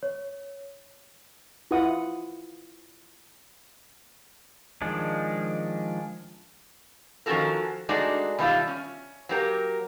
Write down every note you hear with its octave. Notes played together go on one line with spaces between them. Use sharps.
C#5
E4 F4 B4 E5 F#5 D#6
D#3 F3 G#3 D4
D#3 F3 C#4 F#4 A4 A#4
G#3 A3 D4 D#4 F#4 D5
B2 D#3 G3 F4 E5
C#4
F#3 A#3 G4 A#4